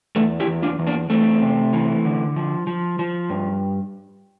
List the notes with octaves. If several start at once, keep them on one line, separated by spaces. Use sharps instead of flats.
E2 A3
E4 G4
E2
D4 F4
E2
A#3 D4
E2 A3 C4
C3
E3
D3
F3
F3
F3
G2